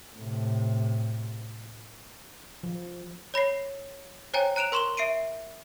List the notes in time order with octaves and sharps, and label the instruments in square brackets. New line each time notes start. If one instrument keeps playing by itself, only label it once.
[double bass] A2 C3
[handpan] F3
[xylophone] C#5 B5 A#6 C7
C5 C#5 G5 G#5 A#5
A#5 F#6 D7 E7 F7
A#4 C6 C#6 E7 F#7 G7
E5 C7 D7 D#7